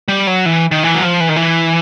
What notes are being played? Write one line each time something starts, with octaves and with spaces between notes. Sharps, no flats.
G3
F#3
E3
D#3
E3
F#3
F3
E3
D#3
E3